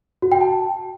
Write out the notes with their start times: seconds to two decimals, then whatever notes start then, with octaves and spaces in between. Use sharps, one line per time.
0.22 F#4
0.32 G5
0.41 A5